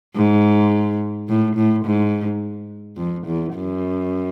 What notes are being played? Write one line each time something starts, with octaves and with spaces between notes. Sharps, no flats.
G#2
A2
A2
G#2
F2
E2
F#2